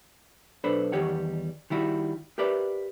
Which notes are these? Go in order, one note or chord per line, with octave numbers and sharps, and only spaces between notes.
B1 D4 A4 B4 C5 B5
E2 D#3 G3 G4 C#5 F#5
D#3 G3 E4 F#4
G4 A#4 B4 D5 E5